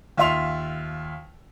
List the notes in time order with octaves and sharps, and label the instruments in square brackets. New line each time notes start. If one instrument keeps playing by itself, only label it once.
[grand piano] D#2 F4 E5 C6 F7